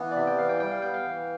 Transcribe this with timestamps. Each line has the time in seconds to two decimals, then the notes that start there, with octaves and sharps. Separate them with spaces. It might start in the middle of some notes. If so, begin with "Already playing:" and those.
Already playing: E3 B3 F5
0.11 D5
0.16 C3 E5
0.27 G5
0.39 E3 F5
0.49 G5
0.60 G3 G5
0.72 F5
0.82 B3 G5
0.94 F5
1.04 E3